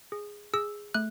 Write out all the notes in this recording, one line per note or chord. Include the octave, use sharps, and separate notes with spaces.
G#4
G#4 E6
A3 F#6